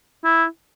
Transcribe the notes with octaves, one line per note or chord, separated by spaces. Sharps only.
E4